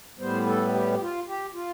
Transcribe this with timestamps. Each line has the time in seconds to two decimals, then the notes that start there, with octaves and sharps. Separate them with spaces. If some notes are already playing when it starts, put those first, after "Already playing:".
0.19 A2 G3 B3 C5
0.47 A4
0.74 G4
0.93 G4
1.01 F4
1.28 G4
1.54 F4